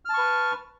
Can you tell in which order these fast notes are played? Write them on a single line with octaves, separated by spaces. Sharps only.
F6 A5 C#6 B4